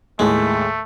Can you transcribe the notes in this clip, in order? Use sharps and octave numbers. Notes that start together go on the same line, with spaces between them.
D#2 A2 G#3 A3